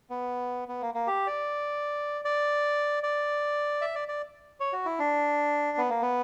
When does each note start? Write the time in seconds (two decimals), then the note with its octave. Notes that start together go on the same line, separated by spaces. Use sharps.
0.10 B3
0.68 B3
0.82 A#3
0.94 A#3
1.07 G4
1.27 D5
2.25 D5
3.03 D5
3.81 E5
3.95 D5
4.08 D5
4.60 C#5
4.73 F#4
4.86 E4
4.99 D4
5.78 B3
5.90 A#3
6.02 B3